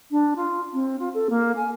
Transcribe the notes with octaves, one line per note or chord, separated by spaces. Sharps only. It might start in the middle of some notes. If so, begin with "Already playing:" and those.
D4
F4
C4
F4
A4
A#3
G#5